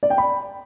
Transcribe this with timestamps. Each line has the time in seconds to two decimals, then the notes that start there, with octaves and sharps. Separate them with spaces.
0.03 D5
0.10 G5
0.18 B5